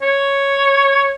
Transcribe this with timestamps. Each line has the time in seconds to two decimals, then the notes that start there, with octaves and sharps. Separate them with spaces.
0.02 C#5